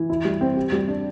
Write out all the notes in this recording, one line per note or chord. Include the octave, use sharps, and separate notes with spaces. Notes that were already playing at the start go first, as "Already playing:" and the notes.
Already playing: E3
E4
G3
C4
G4
G3
D4